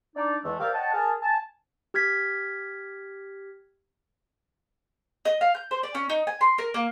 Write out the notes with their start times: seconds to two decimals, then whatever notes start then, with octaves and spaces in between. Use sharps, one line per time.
0.16 D4 D#4 D5
0.45 E2 E3 G#3 A3
0.60 G4 A#4 C5 D5 E5 F5
0.74 C#5 D#5 F#5 G5 A5
0.94 G#4 A#4 A5
1.22 G#5 A5
1.94 G4 F6 G#6 B6
5.25 D#5
5.41 F5
5.55 G6
5.71 C5
5.83 D5
5.95 C#4
6.10 D#4
6.27 G#5
6.41 C6
6.58 A#4
6.74 A#3